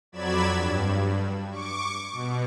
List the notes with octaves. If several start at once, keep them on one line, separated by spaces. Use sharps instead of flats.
F2 F#3 D5 B5 G#6 E7
G2
C#6 D6
B2